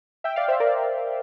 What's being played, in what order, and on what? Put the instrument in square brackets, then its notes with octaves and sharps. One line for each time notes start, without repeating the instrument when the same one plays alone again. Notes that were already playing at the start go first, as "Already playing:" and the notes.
[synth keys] E5 G5
D5 F5
C5 E5
A#4 D5